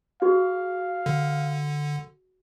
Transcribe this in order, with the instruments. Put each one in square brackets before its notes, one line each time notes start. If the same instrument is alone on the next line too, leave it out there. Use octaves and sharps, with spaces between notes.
[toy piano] F#4 G#4 [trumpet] F5
[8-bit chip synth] D3